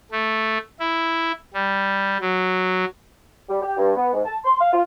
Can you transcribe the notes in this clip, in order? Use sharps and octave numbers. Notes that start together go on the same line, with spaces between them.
A3
E4
G3
F#3
G3
G4
G2
B3
G#2
A5
C6
F5
F4